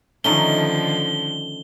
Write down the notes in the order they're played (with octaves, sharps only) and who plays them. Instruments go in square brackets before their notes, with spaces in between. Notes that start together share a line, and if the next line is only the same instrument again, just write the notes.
[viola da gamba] D3 D#3 F3 [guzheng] A3 C#4 D#4 [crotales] G7